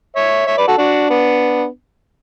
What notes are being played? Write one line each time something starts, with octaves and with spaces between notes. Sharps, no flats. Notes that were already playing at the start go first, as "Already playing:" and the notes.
C#5 E5
C#5 E5
B4 D5
F#4 A4
D4 F#4
B3 D4